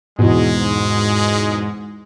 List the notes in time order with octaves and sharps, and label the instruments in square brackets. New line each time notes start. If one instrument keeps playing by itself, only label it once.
[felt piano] E2 B2 [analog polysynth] G#2 [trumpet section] G#3